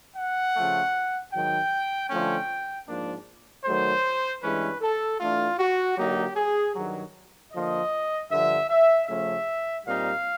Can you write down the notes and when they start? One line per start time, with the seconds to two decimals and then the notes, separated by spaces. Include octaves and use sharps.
0.16 F#5
0.55 C#3 F3 A3
1.32 G#2 D#3 F#3 G5
2.10 D3 F3 A3 C#4 G5
2.88 G#2 F3 A#3 D4
3.65 D#3 F#3 A3 C5
4.42 G2 E3 G#3 C#4 B4
4.81 A4
5.20 E3 A3 D4 F4
5.59 F#4
5.98 D3 F#3 A#3 D#4 G4
6.36 G#4
6.75 G2 D#3 F#3
7.53 D3 F3 A#3 D#5
8.31 G2 D3 F3 E5
8.69 E5
9.08 C#3 F3 A3 C#4 E5
9.85 A#2 G3 C4 D#4 F5